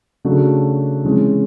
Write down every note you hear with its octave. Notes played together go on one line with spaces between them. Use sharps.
C#3 F#3 A3 D4 F#4
C3 E3 G#3 C#4